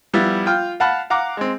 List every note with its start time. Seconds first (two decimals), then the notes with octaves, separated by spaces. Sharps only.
0.14 F3 G3 B3 E4
0.46 F4 G5 F6
0.80 F5 F#5 A5 B5 F6
1.10 F5 F#5 A#5 D6
1.37 G#3 C4